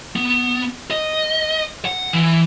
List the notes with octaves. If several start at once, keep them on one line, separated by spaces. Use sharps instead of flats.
B3
D#5
F#5
E3